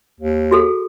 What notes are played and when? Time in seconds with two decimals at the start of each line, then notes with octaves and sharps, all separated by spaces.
0.20 D#2
0.51 F#4 G#4 A4